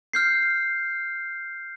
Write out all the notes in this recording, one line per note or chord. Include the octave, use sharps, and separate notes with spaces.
F6 G6 C7